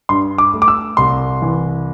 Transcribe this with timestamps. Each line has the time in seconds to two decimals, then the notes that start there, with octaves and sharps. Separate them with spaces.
0.09 G2 C6
0.38 D6
0.54 A3
0.62 D6
0.68 E6
0.97 C2 C6
1.42 E3